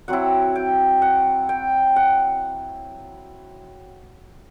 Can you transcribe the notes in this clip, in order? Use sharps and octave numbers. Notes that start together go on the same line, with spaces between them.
F#3 C4 E4 F#5
G5
F#5
G5
F#5